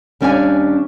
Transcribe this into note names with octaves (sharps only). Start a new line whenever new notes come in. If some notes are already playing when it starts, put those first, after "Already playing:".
D#2 G3 C#4 D4 F5 G#5